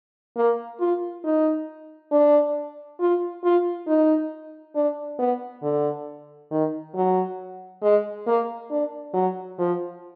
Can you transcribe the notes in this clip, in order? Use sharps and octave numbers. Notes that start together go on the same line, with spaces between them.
A#3
F4
D#4
D4
F4
F4
D#4
D4
B3
D3
D#3
F#3
G#3
A#3
D4
F#3
F3